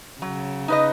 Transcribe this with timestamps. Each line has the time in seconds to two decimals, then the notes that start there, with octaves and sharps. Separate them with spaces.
0.21 C#3 F#3
0.68 D#4 B4 D#5